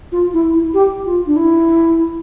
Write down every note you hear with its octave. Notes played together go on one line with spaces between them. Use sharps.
F4
E4
E4
G4
F4
D4
E4